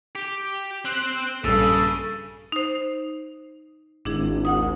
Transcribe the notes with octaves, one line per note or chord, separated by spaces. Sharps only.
G4
C4 C5 F#6
A#1 G2 C#3 A4
D#4 C5
G#1 D4 E4 G#4
D2 F#5 D#6